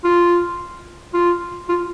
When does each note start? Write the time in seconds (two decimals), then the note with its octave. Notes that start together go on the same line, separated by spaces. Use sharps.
0.04 F4
1.14 F4
1.69 F4